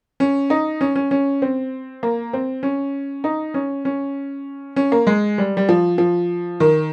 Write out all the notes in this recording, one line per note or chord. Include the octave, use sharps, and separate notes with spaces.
C#4
D#4
C#4
C#4
C#4
C4
A#3
C4
C#4
D#4
C#4
C#4
C#4
A#3
G#3
G3
G3
F3
F3
D#3